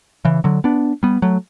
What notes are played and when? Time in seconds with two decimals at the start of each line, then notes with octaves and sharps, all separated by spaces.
0.25 C#3 E3
0.44 D3 F#3
0.64 B3 D4
1.03 G3 B3
1.22 F#3 A3